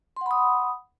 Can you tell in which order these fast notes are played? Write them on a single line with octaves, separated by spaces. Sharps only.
C6 F#5 B5 D#6